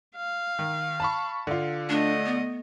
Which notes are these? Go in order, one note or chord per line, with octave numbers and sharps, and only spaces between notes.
F5
D#3
A5 B5 C#6
D3 F4
A3 D4 D#5
B3